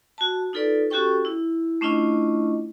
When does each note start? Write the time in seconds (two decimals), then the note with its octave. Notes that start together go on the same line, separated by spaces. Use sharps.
0.18 F#4 A5
0.53 D#4 F4 A4 B4 D5
0.90 C#4 F#4 G4 A4 G5 C#6
1.25 E4
1.81 A3 C#4 D4 E4 F4 D#5